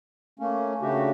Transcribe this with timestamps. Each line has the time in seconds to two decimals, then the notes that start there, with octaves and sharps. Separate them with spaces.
0.39 A3 A#3 C#4
0.82 C#3 A3 D4 F#4 G4